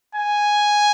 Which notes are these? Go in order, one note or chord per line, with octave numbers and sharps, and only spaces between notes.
G#5